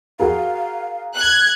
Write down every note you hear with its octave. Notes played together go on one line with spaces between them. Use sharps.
F#4 G#4 A#4 F5
F#6 G#6